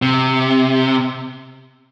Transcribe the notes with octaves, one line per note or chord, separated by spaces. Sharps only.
C3